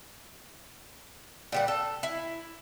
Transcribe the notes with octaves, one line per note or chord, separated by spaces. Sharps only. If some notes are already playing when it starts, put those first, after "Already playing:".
A#2 G3 F#5
A4
E4